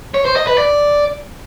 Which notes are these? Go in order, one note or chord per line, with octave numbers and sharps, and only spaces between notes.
C#5
C5
D#5
B4
D5